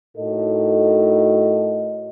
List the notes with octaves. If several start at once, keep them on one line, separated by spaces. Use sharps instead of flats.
A2 D#4 F#4 A4 A#4 D#5